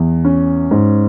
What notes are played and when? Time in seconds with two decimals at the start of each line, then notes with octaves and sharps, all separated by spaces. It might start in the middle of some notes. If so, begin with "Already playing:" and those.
Already playing: E2
0.24 C#4
0.71 G#2